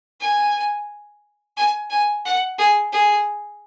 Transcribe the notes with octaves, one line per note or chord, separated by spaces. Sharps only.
G#5
G#5
G#5
F#5
G#4
G#4